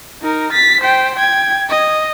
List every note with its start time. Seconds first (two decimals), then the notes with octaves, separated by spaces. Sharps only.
0.22 D#4 A#4
0.52 A6 B6
0.81 C5 G5
1.16 G5 G#6
1.69 D#5